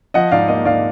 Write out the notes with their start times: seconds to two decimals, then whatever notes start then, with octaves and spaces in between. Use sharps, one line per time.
0.14 F3 D#5 F#5
0.31 G#2 D5 F5
0.48 A#3 D#5
0.65 G#2 D5 F5